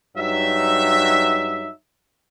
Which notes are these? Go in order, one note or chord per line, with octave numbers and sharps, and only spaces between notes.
G2 F#3 D#4 E5